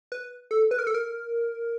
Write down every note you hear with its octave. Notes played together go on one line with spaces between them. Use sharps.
B4
A4
B4
A#4
A4
A#4